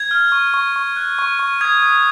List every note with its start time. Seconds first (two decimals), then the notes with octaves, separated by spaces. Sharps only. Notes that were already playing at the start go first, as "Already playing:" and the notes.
Already playing: G#6
0.11 F6
0.32 C#6
0.54 C#6
0.76 C#6
0.96 F#6
1.19 C#6
1.39 C#6
1.61 D#6 G#6
1.83 D#6 G#6